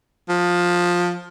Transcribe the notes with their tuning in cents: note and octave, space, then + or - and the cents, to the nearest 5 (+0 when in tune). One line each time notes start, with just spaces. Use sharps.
F3 +15